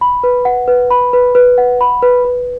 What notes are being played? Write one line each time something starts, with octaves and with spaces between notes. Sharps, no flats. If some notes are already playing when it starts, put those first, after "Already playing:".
B5
B4
F#5
B4
B5
B4
B4
F#5
B5
B4
B4